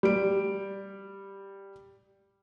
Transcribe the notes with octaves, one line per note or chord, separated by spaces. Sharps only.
G3 D7